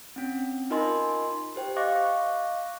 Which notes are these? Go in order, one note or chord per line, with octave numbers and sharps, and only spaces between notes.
C4 C#4
D#4 F4 A#4 D#5 G#5 C6
G4 C5 G5
D#5 F5 C#6 D6 F#6 A#6